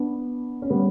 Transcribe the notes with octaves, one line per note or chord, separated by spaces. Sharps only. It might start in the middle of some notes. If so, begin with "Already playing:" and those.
Already playing: B3 D4
C#4
G3 B3